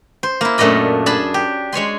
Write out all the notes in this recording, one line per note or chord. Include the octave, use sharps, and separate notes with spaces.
C5
A#3 E4
F#2 A#2 A3 D4 D#5 B5
D4 G#4 A5 B5
G4
G#3 C#5 G#5 C6